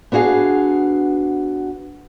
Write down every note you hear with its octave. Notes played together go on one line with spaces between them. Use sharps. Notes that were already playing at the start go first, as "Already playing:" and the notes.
B3 D4 F#4 G#4 F5